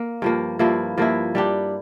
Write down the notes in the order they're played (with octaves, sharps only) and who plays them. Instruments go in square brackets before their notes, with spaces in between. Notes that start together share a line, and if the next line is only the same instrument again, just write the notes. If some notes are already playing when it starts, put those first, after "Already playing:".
Already playing: [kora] A#3
G2 F3 A#3
G2 F3 A#3 E4
G2 F3 A#3 E4
G3 D4 G4